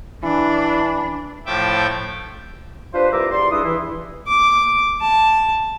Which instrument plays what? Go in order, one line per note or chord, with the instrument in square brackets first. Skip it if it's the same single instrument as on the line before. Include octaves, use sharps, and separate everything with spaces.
[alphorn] E3 [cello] D4
[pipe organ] A2 F3 A3 E5 G5 D6
[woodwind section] D4 F4 G4 B4 C5
C2 G2 F4 E5 A#5 D6
E2 G3 D5 C6
G2 E4 G#4 A4 B4 D#6
E3 E4
[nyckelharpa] D6
A5